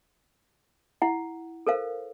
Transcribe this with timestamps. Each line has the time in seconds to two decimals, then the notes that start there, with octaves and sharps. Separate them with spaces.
1.02 E4 F#5
1.67 A4 A#4 C5 F5